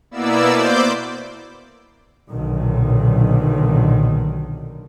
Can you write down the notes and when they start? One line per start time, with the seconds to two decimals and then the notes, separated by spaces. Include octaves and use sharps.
0.11 B2 A#3 B3 E4 D5 E6
0.53 C5 D5 D6 G6
2.31 B1 A#2 D3 D#3